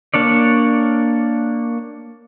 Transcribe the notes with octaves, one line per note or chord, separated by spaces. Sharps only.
A#3 D4 C#5 D5